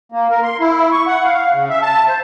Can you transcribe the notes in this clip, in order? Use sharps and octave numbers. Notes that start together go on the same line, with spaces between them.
A#3
A#4
C6
E4
C#6
F#5
F5
C#3
E5
A5
C5